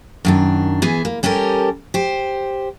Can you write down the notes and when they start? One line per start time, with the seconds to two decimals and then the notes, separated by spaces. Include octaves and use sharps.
0.25 F#2 D#3 D4
0.82 E3 B3 G#4
1.05 A#3
1.23 G3 C#4 G4 A4 A#4
1.94 G4 C5